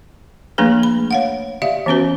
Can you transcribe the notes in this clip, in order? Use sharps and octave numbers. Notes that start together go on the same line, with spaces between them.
F3 A3 A#3 D4 G#4 B4
B5
C#5 F5 F#5
G4 D5 E5 F5
E3 B3 C#4 F#4 B4